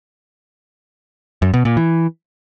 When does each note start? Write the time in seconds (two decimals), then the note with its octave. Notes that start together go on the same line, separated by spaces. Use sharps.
1.42 F#2
1.54 B2
1.65 A#2
1.77 E3